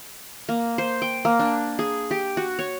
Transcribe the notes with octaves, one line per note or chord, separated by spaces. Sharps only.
A#3
C5
G5
A#3
D4
G#4
G4
F#4
C#5